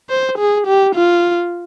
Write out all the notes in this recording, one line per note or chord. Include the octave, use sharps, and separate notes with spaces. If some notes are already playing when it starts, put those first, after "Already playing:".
C5
G#4
G4
F4